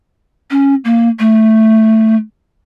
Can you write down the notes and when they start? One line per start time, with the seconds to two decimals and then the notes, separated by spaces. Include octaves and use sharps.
0.51 C#4
0.85 A#3
1.19 A3